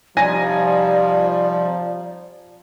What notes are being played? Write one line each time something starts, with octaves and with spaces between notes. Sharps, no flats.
C3 F3 G3 D#4 D5 G#5 A#6